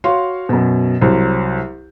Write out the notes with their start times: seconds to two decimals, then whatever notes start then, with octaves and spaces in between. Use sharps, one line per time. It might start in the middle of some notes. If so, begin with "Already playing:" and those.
0.04 F#4 C#5 F5 C6
0.49 F#2 B2
1.01 C2 F#3 C5